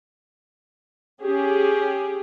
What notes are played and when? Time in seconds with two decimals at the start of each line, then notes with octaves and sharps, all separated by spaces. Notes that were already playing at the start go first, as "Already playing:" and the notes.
1.21 C#4 G4 G#4